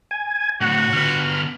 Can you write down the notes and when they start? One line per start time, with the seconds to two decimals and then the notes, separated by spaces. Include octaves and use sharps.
0.11 G#5
0.61 A2 D3 F#4 F#5
0.93 D3 B3 F6